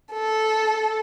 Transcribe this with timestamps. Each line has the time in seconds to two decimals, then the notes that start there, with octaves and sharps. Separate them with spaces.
0.12 A4